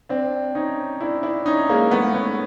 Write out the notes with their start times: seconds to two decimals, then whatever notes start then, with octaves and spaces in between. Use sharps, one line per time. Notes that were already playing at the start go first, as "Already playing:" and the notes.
0.09 C4 D4
0.55 C#4 D#4
1.01 D4 E4
1.23 D4 E4
1.46 C#4 D#4
1.69 G#3 A#3
1.91 A3 B3
2.14 B3 C#4